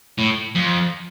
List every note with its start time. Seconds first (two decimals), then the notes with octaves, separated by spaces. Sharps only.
0.18 A2
0.55 F2